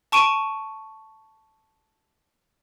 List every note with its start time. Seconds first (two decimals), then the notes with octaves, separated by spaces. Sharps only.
0.12 A5 C#6 D7 D#7